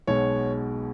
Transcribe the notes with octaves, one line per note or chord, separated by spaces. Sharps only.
B1 B2 G#3 C#5